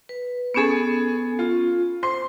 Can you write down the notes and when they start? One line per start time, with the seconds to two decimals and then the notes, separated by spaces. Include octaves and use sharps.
0.09 B4
0.54 B3 C#4 G#4 A4 C#7
1.39 F4
2.03 C5 C6